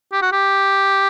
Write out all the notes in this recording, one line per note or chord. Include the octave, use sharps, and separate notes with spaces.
G4
F#4
G4